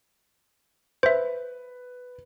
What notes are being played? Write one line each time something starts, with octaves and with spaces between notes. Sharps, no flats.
B4 C5 E5